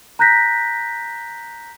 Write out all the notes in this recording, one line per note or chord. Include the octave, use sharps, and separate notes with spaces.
A#5 F#6 G6 A#6 B6